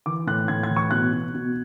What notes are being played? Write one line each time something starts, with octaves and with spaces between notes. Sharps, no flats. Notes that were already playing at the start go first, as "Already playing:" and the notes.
E3 D6
A2 F#6
A2 G#6
G#6
E3
C#6
B2 F#6
B2
B2